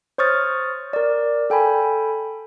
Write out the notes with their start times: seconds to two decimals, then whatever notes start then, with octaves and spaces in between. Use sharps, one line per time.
0.18 C5 C#5 C#6 D#6 F6 A6
0.93 A#4 D5
1.50 A4 G5 G#5 B5